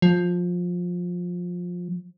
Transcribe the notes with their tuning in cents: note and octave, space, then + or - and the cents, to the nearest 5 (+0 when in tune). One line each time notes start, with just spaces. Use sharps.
F3 +20